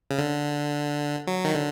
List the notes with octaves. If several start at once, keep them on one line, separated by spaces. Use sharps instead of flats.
C#3
D3
F#3
D#3
D3